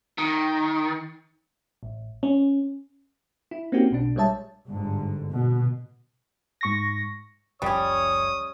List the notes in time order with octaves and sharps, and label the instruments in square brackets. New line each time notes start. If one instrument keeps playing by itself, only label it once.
[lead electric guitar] D#3
[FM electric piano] A1
C#4
E4
A#3 C4 C#4 D#4 F#4 G4
B1 B2 D4
A#1 G3 G#3 C#5 E5 A5
[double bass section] G1 G#2 D3
B2
[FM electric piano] G#2 C#6 A#6
[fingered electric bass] F#1 C#2 F3 [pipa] G3 C#4 [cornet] C#5 [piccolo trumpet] D#6